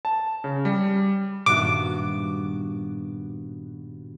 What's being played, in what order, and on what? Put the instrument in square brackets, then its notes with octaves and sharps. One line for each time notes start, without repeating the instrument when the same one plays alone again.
[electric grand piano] A5
C#3
G3
[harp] G2 B3 F#4 [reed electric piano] A#2 D#3 [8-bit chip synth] D6